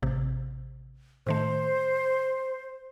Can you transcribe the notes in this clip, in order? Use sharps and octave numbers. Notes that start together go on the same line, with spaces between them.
A1 C3
A2 D#3 A3 C5